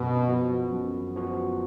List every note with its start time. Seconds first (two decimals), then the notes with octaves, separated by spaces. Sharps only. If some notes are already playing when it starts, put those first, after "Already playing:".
Already playing: F#2 B2
0.28 F3 B3 F#4
0.71 F#2
1.16 F3 B3 F#4